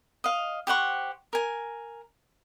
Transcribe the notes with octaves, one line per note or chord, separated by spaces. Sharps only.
D#5 F5
G4 C5 F#5 C#6
A#4 G#5